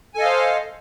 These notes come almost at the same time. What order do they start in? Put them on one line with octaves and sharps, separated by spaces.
G#5 A4 D#5 F5 C5